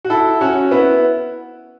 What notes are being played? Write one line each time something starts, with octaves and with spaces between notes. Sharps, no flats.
F#4
E4 A4
C#4 F#4
B3 E4